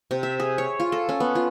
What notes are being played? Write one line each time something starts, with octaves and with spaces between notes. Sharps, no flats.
C3
E5
G#4
C#5
F4
A4
C#4
B3
F4